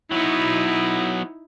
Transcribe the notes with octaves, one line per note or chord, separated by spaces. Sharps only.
F#3 B3 D#4 E4